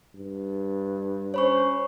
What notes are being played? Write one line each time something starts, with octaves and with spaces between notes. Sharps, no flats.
G2
C#4 C5 C#5 B5 C#6